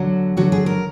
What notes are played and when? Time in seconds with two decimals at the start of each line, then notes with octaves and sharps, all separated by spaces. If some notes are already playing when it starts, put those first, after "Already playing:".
Already playing: D3 F#3
0.37 D3 F#3 F#4
0.52 G#4
0.66 A#4